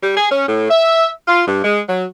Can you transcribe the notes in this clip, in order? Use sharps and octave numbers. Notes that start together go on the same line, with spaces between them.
G3
G#4
C#4
A2
E5
F4
G2
G#3
F#3